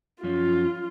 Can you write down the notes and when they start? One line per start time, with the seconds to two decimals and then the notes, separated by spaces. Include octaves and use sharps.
0.23 F#2 F3 C#4 F4